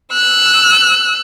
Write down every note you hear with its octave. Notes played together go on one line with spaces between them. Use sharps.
E6 F#6